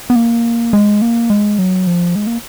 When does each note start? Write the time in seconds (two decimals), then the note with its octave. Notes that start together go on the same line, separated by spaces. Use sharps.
0.10 B3
0.16 A#3
0.73 G#3
1.02 A#3
1.30 G#3
1.59 F#3
1.87 F3
2.16 G#3
2.27 A#3